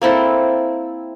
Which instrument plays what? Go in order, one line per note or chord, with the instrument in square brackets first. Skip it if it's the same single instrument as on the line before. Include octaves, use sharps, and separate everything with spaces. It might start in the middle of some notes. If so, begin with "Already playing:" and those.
[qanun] A#3 C4 E4 A4